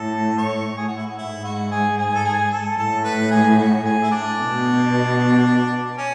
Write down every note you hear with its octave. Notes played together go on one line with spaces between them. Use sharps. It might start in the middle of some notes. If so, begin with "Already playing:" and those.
Already playing: A2 A4
C#5
G#4
F#4
E4
F#4
G#2 E4
F#4
G#4
G#4
A4
G#4
A4
A2 A4
B4
G#4
F#4
G#4
E4
D4
B2
C#4